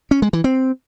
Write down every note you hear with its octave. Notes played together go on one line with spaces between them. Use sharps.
C#4
G#3
E3
C4